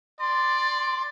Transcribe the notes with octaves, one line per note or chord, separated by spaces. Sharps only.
D5 C6